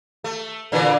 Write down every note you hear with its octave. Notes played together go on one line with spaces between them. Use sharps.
A3
A#2 D3 E3